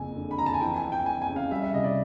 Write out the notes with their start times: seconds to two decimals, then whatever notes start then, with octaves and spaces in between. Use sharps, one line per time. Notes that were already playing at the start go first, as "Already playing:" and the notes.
Already playing: F#1 F2 G#5
0.16 D3
0.31 B5
0.38 F2 A#5
0.46 A5
0.54 G#5
0.61 E3 G5
0.76 G#5
0.84 F2
0.92 G5
1.06 F2 G#5
1.22 G#5
1.29 C#3
1.36 F5
1.51 G3 E5
1.62 E5
1.74 C2 D#5
1.84 D5